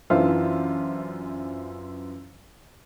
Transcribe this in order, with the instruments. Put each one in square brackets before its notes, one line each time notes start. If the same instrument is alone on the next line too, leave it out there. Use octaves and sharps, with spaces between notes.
[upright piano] F#2 E3 D4 F4 C5 E5